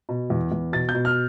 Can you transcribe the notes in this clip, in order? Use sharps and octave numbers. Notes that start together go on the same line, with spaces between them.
B2
E2
E2
B2 A6
G6
B2
F6